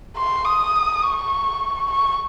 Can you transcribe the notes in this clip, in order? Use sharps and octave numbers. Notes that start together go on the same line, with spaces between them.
C6
D#6
C#6
C#6